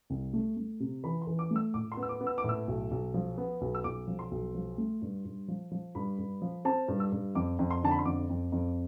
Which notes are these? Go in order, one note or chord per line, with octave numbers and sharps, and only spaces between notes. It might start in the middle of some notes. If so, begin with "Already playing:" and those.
C2
A3
A3
C3
E3 B5
C6
E3
D6
A3
E6
A2 D6
C6
B3
E6
D6
B3
E6
D6
A2
E6
B1
B1
F3
B3
B1
E6
B1 D6
F3
C6
B1
F3
A3
G2
G2
F3
F3
G2 B5
G2
F3
C4 A5
G2
E6
G2
F2 D6
F2
C6
D3 A5
B5
C6
F2 D6
F2
F2